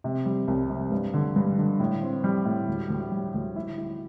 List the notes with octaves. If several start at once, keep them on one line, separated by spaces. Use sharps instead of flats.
C3
G3
C2
C3
G2
D3
G2
D3
A2
C4
G3
A2
D2
D2
G3
D2
E4
E4